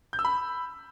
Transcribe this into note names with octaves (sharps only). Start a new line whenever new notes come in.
G6
E6
B5